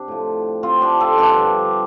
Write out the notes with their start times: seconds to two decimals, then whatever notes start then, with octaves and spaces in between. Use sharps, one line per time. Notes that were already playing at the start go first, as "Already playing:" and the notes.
Already playing: C3 D4 G4
0.08 A2 F3
0.63 C4 F4
0.82 D4 G4
1.00 F4 A4
1.18 G2 D3 F3 D4 G4